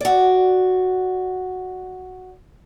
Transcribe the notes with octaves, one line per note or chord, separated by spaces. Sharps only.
F#4 D5